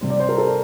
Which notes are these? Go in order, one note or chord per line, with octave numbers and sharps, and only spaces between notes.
C3 G3 C4
D5
C5
A#4
A4